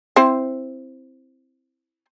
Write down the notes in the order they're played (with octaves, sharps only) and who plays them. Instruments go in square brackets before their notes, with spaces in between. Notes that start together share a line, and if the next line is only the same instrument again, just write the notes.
[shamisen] C4 E4 C5